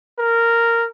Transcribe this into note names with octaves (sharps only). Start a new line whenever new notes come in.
A#4